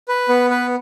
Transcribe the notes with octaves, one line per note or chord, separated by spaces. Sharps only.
B4
B3
B4